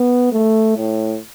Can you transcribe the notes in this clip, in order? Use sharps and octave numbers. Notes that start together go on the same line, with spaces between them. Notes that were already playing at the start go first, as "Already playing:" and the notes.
Already playing: B3
A3
A2